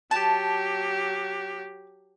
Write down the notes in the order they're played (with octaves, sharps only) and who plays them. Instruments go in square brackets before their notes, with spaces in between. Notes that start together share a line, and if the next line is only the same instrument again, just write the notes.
[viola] F#3 G4 [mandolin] A5